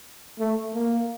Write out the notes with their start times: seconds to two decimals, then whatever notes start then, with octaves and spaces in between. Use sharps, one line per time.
0.40 A3
0.75 A#3